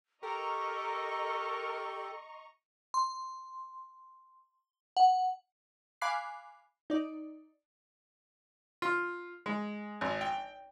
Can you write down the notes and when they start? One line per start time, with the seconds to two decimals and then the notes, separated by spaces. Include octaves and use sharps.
0.23 G4 A4 A#4 D#5 A#5 C#6
2.94 C6
4.97 F#5
6.02 F5 G#5 B5 D6 F#6 C7
6.90 D#4 D5
8.82 F4
9.46 G#3
10.01 G#1
10.21 G5